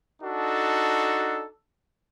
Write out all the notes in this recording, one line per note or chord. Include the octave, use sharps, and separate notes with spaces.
D4 D#4 F#4 A4